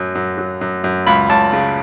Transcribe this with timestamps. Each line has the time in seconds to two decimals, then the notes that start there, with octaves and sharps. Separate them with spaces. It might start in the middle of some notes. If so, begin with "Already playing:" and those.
Already playing: F#2 F#3
0.15 F#2
0.38 F#3
0.61 F#2
0.84 F#2
1.07 C#2 B5
1.29 C#2 A5
1.53 C#3